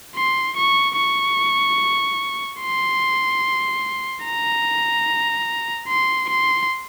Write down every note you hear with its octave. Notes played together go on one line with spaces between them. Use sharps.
C6
C#6
C#6
C6
A#5
C6
C6